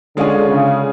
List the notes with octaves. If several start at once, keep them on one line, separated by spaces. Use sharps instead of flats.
D3 G#3 C#4 F4 G#4
C#3